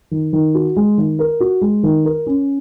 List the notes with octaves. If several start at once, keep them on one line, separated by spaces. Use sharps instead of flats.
D#3
D#3
F#4
G#3
D#3
A#4
F#4
G#3
D#3
A#4
C#4